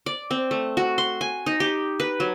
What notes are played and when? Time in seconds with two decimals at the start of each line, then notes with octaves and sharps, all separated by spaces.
0.06 D5
0.31 C4
0.51 A3
0.77 F#4
0.98 C6
1.21 G#5
1.46 D#4
1.60 G4
2.00 B4
2.20 F#3